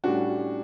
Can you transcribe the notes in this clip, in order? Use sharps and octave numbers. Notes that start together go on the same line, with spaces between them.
A2 G3 C#4 D4 F#4